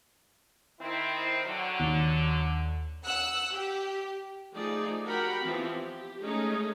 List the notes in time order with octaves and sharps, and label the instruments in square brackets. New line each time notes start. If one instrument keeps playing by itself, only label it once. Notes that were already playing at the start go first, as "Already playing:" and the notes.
[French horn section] D#3 C4 E4
D3 F#3
[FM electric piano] D#2
[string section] F#5 E6 F#6
G4
[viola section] F3 A3 D#4 G#4 D5
F#4 G4 A#4 F#5 G5 B5
E3 F3 B3 C4 G4
G4
G#3 A3 C#4 D#4 G#4